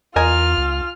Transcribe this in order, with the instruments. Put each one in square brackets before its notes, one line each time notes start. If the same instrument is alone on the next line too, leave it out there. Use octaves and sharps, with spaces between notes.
[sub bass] E2 [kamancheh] F4 F6 [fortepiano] A#4 D#5 G#5
[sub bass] C#2